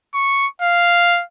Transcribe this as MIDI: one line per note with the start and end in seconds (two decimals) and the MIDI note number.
0.14 0.47 85
0.62 1.23 77